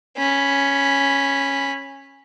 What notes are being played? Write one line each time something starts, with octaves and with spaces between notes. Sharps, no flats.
C#4 B5